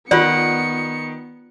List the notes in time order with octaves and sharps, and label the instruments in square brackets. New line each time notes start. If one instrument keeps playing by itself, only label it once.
[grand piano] D#3 [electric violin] B3 C#7 [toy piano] F4 D5 [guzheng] F#5